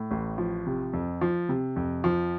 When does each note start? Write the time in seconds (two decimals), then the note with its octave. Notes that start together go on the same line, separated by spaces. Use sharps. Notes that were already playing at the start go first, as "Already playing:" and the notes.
Already playing: A2
0.11 A1
0.38 F3
0.67 C3
0.93 F2
1.21 F3
1.49 C3
1.76 F2
2.04 F3